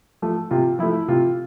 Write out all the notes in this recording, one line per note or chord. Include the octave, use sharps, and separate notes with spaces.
F3 A3 A4
C3 F4
F3 A3 E4
C3 F4